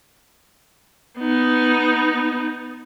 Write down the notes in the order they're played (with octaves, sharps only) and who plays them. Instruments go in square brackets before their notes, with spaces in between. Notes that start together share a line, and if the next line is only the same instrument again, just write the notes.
[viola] B3 D#4